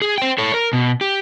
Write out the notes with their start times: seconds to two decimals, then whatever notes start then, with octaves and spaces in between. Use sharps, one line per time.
0.02 G#4
0.18 C5 G5
0.38 A4 C#5
0.54 A#4
0.73 B2
1.01 G4